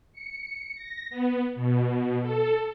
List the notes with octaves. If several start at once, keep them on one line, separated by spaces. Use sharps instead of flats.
C#7
A#6
B3
B2
A4